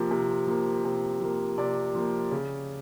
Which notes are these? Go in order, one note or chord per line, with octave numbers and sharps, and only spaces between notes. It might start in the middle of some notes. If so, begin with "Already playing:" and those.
Already playing: C3 F3 A#3
C3
F3 A#3
C3
F3 A#3
C3 D5
F3 A#3
C#3